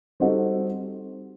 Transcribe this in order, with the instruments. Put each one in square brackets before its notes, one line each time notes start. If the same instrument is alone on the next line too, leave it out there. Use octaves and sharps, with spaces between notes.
[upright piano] G3 C4 D#4 F#4 A4